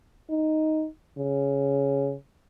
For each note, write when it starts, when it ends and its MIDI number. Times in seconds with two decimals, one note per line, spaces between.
0.30 0.86 63
1.18 2.15 49